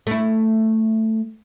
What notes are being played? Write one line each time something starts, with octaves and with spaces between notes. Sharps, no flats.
A3 E4